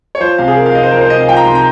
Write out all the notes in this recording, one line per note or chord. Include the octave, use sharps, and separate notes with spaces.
C#5
F3 C5
C3 F5
G#4
F3 A#4
F5
C3 D#5
C5
F3 A#4
C5
C3 D#5
F5
F3 G5
A#5
C3 C6
A#5